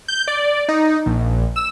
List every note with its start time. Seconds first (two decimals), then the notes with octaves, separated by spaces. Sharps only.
0.08 G6
0.28 D5
0.69 D#4
1.06 A#1
1.56 E6